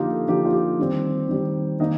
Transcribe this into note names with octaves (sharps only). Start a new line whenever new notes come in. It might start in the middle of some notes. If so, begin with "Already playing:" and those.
Already playing: D3 F3 A#3 D#4 F4 G4
A4
D3 F3 A#3 D#4 G4
F4
G4
D#3 G3 C4
D#3 G3 C4
D#3 A#3 D#4 D#5